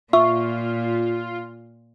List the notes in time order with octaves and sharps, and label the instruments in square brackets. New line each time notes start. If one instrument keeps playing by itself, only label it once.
[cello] A#2 [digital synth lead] F4 [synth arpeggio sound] E5 [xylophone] C#6